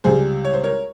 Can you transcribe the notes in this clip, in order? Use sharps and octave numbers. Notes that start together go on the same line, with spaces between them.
C#2 C3 G3 G#4 C5
C#5
C5
A#4 C#5